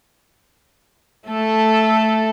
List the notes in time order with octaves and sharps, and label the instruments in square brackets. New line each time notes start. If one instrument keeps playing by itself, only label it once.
[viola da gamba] A3 A4